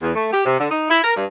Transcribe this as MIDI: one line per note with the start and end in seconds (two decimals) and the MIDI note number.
0.02 0.13 40
0.15 0.30 57
0.32 0.44 67
0.45 0.58 48
0.59 0.68 50
0.70 0.89 63
0.90 0.99 64
1.03 1.15 70
1.16 1.24 43